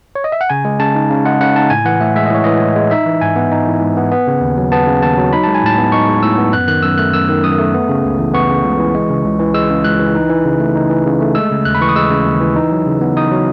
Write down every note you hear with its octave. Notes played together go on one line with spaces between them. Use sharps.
C#5
D#5
E5
F#5
C#3 G#5
G#3
C#3 A5
D#4
C#3
G#3 F#5
C#3 F#5
D#4 A5
A2 G#5
E3 F#5
A2 E5
G#3 E5
D#5
A2 C#5
E3 D#5
A2
G#3
D#4 E5
E3
G#2 G#5
B3
D#4
E3
G#2
B3
B3
C#3
D#2
F#3
B3 A5
C#3
D#2 A5
F#3
D#4 B5
G#3 A5
G#5
A2 A5
B3
D#4 C#6
G#3
A2 E6
B3
F#2 F#6
D#3 F#6
F#2 E6
A3 F#6
F#2 E6
D#3
F#2 D#6
A3
B3
C#3
C#2
E3
B3 C#6
C#3
C#2
E3
G#3
C#3
C#2
E3
G#3 E6
C#3
C#2 F#6
E3
D#4
E3
C#3
A3
D#4
E3
C#3
A3
G#3 E6
C#3
D#2 F#6
B5
E3 C#6
D#6
G#3 E6
C#3
D#2
E3
D#4
F#3
C#3
B3
D#4 D#6
F#3